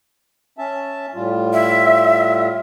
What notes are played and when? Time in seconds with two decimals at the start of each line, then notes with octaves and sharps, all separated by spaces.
0.58 C#4 E5 A5
1.15 A2 G3 F4
1.53 E5